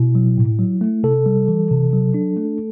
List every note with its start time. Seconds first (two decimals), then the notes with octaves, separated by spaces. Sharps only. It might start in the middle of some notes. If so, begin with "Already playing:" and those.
Already playing: B2 E4
0.15 F#3
0.38 A2
0.59 F#3
0.81 A3
1.03 C3 A4
1.26 G3
1.48 E3
1.71 C3
1.93 F#3
2.14 D4
2.37 A3